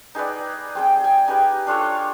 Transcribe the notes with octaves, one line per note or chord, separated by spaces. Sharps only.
D#4 G#4 B4 D5
C4 G#4 G5
G5 G#5
D#4 G4 G#4 B4
D4 F4 A4 C#5